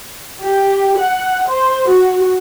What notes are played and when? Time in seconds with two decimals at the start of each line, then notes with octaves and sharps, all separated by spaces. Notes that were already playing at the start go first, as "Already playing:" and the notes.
0.41 G4
0.99 F#5
1.48 C5
1.89 F#4